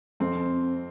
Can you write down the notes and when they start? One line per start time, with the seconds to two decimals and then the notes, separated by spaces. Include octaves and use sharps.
0.20 F2 C4